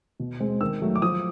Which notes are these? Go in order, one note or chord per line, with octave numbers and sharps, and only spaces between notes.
B2
G#3 C4
D#3 E6
F#3 A3
D6
F3 D#6